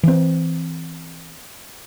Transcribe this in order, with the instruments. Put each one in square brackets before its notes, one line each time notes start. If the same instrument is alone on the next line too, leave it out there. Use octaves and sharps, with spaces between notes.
[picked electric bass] E3 C4